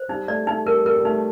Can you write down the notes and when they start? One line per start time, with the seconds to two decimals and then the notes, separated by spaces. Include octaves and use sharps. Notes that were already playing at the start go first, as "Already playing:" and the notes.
Already playing: C5
0.09 G3 D#4
0.28 A3 D5
0.47 A3 D#4
0.66 G3 A#4
0.85 G3 A#4
0.97 G3
1.05 A3 D#4